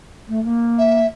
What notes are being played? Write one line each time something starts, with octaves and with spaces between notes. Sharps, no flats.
A3
A#3
E5